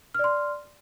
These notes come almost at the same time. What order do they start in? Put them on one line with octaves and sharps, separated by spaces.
F6 D5 C6